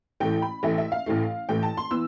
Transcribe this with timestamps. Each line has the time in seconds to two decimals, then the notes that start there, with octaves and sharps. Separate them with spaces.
0.20 A1 A2 E3 A3 G5
0.42 B5
0.63 A1 A2 E3 A3 E5
0.78 E5
0.92 F5
1.06 A1 A2 E3 A3
1.49 A1 A2 E3 A3 G5
1.63 A5
1.77 C6
1.91 E3 B3 E6